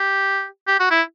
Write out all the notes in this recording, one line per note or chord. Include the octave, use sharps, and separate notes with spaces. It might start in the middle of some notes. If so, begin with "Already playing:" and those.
Already playing: G4
G4
F#4
E4